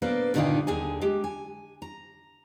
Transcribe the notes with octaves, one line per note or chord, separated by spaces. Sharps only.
B2 A#3 D4 A4 B4 C5
G2 A#2 D3 D#3 D#4 F4
D#2 D3 G#4 G#5
G#3 G4
G#5
A#5